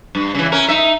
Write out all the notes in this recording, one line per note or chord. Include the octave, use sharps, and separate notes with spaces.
G2
C#3 E3
C#4 A#4
D#4 E5